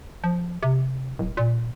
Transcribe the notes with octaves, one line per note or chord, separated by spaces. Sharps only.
F3
C3
D1
A#2